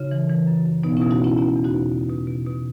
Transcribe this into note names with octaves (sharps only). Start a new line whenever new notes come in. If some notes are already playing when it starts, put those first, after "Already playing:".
Already playing: C#3 D#4 F#4
E3
E3
F#2
F#2
B2 B3 D#4
B2 C#4 E4
D#4 F#4
B2 C#4 E4
B2 C#4 E4
E2
D#4 F#4
B2
B2
B2
B2
B2